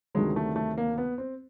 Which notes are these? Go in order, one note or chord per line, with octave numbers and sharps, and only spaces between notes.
D2 C3 D#3 F#3 G#3
A3
A3
A#3
B3
C4